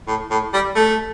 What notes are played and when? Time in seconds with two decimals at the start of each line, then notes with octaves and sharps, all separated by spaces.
0.08 A2
0.31 A2
0.54 G3
0.76 A3